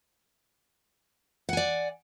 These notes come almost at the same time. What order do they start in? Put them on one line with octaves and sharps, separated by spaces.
F#5 G#5 D5